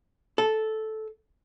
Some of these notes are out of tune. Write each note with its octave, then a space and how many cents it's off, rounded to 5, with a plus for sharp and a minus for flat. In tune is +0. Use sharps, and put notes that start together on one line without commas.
A4 -10